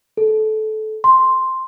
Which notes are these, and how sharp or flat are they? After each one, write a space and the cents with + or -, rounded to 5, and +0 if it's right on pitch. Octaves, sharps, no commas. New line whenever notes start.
A4 -20
C6 +0